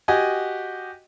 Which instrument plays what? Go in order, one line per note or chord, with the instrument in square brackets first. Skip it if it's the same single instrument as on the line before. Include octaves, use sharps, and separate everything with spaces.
[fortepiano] F#4 G4 D#5 G#5